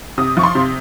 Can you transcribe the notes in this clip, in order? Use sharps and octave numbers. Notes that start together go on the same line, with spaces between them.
C3 D#6
F3 C#6
C6
C3